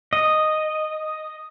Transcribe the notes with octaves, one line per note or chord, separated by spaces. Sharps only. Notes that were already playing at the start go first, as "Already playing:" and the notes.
D#5